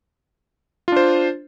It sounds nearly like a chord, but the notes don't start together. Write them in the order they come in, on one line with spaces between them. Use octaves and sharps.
F4 D4 C5